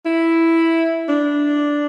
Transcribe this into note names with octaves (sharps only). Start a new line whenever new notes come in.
E4
D4